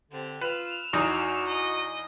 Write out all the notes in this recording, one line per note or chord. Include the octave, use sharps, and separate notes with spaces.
D3 C4 G4
F4 B4 E6 F6
E2 D#4 F#4
D#5